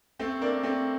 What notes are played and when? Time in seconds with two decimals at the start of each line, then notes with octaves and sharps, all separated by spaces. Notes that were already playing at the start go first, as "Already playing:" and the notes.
0.19 A3 C4
0.41 A#3 D4
0.63 A3 C4